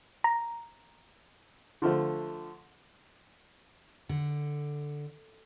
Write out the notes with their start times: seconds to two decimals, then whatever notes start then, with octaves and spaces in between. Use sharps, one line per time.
0.24 A#5
1.82 D3 F3 A3
4.09 D3